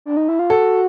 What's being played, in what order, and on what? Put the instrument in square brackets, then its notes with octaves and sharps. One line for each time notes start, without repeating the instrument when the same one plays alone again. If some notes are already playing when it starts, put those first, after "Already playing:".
[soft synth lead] D4
D#4
E4
F4
[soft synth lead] F#4 [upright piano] A4